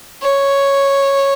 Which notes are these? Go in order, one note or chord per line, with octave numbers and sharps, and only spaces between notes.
C#5